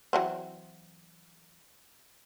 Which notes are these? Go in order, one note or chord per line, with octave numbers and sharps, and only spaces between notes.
E3 F#3 C4